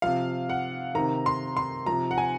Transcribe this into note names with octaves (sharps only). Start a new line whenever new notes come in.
C3 F3 F5
F#5
C3 D#3 A#5
C6
C6
C3 F3 A#5
F#5
G#5